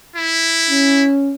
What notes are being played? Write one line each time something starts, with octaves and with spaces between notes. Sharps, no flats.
E4
C#4